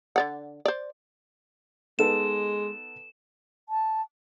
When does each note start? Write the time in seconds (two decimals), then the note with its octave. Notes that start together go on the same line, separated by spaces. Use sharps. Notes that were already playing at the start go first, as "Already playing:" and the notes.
0.16 D3 D5 F#5
0.65 C5 D5
1.99 G#3 B3 D#4 A4 E7
3.69 A5